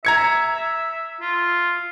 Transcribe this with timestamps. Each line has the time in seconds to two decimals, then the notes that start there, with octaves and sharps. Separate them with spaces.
0.05 E5 A#5 G#6 C#7
1.21 F4